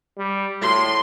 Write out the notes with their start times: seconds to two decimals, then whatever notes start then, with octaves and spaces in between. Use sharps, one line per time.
0.18 G3
0.62 A2 C6